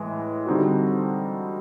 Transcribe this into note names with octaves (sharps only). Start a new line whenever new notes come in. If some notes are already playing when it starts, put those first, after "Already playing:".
Already playing: A2 E3 G#3
D3 G3 C4 D#4 F#4